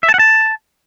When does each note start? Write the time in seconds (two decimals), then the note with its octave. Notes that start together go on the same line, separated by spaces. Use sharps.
0.03 E5
0.09 A5
0.14 F#5
0.19 A5